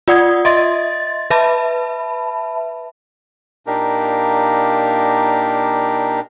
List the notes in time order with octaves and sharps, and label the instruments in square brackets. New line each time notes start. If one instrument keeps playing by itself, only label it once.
[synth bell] F4 D5 F#5 D#6 G#6
D#5 E5 C6 A6
B4 E5 A5 B5
[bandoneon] A#2 A#3 D4 D#4 G4 A#4